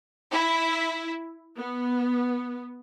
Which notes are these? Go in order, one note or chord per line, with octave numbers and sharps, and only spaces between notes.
E4
B3